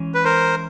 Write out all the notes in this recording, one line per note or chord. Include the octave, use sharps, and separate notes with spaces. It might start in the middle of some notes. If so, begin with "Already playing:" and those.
Already playing: E3 G#3 C#4
B4
A#4 C5